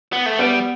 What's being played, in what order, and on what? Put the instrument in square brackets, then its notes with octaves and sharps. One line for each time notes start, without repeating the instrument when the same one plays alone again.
[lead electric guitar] B3
A3
[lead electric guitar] G3 [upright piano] B3